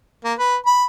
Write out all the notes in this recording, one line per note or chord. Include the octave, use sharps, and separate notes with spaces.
A#3
B4
B5